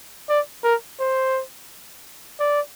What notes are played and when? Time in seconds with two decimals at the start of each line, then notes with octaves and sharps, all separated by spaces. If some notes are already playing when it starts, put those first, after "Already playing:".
0.30 D5
0.64 A#4
1.00 C5
2.40 D5